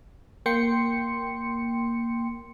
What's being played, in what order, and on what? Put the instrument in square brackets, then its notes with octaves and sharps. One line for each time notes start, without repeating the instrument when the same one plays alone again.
[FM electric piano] A#3 G5 C6 C#7